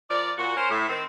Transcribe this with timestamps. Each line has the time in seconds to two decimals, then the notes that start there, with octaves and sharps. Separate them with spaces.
0.10 F3 A#4 D5
0.37 A#2 F#4
0.57 C#4 A#4 C5
0.70 A2
0.89 D#3 C4